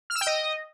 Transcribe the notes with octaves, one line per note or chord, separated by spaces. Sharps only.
F6
E6
G5
D#5